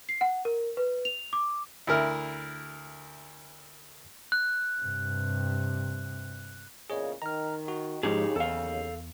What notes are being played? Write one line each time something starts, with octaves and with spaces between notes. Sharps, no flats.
C7
F#5
A#4
B4
F7
D6
D2 E4 A#4
F#6
G2 C3
E2 A#2 C#3 G#4 C#5 D#5
D#3 A#5 F6
F#4
D#2 G#2 C#3 F3 G#3 D#4 G4 G#4
E2 A4 F5